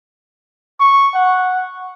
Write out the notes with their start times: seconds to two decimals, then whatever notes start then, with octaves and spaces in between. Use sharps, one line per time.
0.80 C#6
1.15 F#5